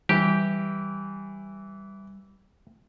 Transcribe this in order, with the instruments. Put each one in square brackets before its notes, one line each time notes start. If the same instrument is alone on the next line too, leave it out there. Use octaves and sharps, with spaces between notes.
[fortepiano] E3 [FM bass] G3 [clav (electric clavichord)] G4